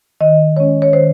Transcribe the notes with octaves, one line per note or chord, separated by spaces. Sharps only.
D#3 D#5
G#3 C#4 C#5
C#5
D#3 C5